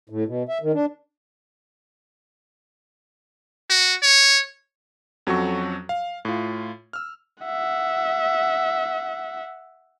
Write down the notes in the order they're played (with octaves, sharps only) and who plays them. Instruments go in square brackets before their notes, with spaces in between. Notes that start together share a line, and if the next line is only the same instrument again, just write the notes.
[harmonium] A2
B2
E5
D#3
D4
[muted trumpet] F#4
C#5
[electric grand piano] F2 F#3 C#4 F#4 A4 C#6
F5
A2 F4
E6 F6
[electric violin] E5 F#5